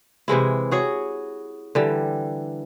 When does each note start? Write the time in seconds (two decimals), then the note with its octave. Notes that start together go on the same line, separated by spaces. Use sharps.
0.28 C3 E3 G#3 E4
0.71 F#4 G#4 C#5
1.75 D3 E3 G3